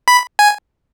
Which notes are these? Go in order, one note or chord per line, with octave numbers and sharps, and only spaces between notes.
B5
G#5